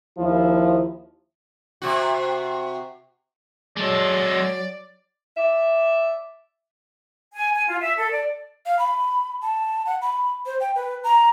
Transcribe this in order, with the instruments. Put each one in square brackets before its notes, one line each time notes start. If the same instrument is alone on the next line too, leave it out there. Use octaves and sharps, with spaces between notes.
[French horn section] D#2 F3 E4
[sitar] C3 F#4
[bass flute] F#3 [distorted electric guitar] G#3 A4 [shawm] D5
[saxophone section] D5 E5
[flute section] G#5
G#5
F4
E5
A4
D5
[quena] F5
B5
A5
F#5
B5
C5
G5
B4
A#5